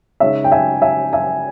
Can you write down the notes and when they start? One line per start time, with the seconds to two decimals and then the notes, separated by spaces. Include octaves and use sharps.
0.20 C#3 G#3 D#4 C#5 E5
0.44 G5
0.52 E5 G#5
0.82 E5 G#5
1.13 E5 G#5